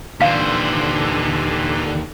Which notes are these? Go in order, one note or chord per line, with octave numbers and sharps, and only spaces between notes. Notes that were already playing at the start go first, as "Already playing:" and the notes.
D#2 A#2 D3 E3 C5 F5 B6